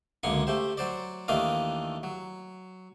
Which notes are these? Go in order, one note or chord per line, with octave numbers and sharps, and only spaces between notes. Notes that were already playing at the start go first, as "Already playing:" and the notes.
C#2 F#2 D3 A#3 C6 C#6
A3 G4 C5
F#3 C5 D5
D#2 D#3 E3 A3 D4 F5
F#3